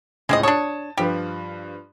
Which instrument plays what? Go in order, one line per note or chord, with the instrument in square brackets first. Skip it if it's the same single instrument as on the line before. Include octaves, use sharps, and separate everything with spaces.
[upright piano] C#2 A2 [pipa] G#3 C4 D#5
[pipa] D4 C#5 [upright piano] A5 D#6
[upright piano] G2 F3 B4 [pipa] G4